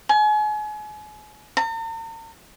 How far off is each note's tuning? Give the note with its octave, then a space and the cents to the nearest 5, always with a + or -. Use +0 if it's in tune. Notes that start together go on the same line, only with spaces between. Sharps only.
G#5 +35
A#5 -45